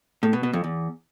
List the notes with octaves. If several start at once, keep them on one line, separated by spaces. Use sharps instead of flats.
A2
B2
B2
F2
E2